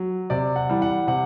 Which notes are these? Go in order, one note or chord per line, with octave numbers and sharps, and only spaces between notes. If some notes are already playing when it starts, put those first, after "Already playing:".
Already playing: F#3
C3 D5
F#5
E3 G3
F#5
C3 F#5